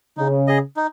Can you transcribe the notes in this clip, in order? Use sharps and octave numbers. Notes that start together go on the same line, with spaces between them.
C#3 D#4
G#4 D#5
D#4